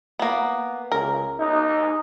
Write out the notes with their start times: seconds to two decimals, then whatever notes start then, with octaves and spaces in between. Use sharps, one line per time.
0.19 A#3 B3
0.92 C#2 A#4
1.39 D#4